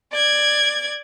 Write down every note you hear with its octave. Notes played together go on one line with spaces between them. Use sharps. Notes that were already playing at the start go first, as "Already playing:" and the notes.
D5 G#6